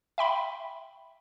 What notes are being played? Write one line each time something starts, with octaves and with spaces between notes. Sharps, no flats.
E5 G5 B5 C6